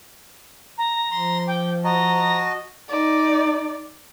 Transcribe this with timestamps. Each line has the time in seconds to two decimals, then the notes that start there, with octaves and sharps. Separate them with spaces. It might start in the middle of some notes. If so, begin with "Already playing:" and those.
0.78 A#5
1.11 F3 C6
1.47 G5 D6
1.84 F#4 D#5 A5 A#5
2.89 D#4 D5